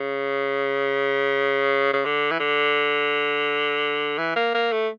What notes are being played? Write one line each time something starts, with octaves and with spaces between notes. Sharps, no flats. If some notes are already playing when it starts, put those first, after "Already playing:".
Already playing: C#3
C#3
D3
E3
D3
E3
A#3
A#3
A3